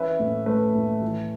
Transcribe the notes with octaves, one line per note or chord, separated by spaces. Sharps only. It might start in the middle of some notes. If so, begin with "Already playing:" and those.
Already playing: E3 C#4 B4 E5
A2
A3 B4
A2
E3